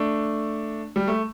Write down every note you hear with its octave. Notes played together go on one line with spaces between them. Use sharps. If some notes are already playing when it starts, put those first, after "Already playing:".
Already playing: A3 D4
G3
A3